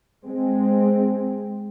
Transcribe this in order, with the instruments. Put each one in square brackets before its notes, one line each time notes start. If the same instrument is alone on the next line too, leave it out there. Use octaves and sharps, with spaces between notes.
[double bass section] G#3 C4